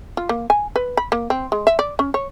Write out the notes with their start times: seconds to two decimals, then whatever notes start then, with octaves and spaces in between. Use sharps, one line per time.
0.17 F4
0.29 A#3
0.50 G#5
0.76 B4
0.97 B5
1.12 A#3
1.30 C4
1.52 G#3
1.67 E5
1.79 D5
1.99 C#4
2.14 C#5